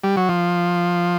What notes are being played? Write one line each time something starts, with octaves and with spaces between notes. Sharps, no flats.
G3
F#3
F3